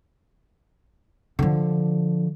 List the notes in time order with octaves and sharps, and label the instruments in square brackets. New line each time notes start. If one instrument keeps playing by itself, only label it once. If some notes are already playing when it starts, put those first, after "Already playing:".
[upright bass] D3 F3